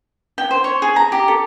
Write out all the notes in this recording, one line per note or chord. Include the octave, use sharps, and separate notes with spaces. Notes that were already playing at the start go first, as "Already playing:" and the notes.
G5
C5
C#5
G#4
A#5
G4
A4